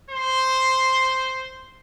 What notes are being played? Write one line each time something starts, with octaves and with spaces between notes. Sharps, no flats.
C5